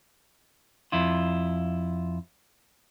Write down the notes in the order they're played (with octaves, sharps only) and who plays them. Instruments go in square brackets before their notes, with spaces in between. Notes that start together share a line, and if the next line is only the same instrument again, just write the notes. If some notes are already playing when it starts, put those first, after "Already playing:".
[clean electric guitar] F2 E4 F4